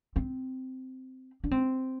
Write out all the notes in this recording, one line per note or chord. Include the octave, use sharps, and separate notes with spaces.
C4
D4
C4